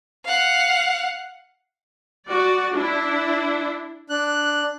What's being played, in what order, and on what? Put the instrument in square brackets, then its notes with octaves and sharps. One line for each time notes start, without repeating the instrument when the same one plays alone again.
[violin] F5 F#5
[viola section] F#4 D5
D4 E4
[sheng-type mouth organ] D4 F#6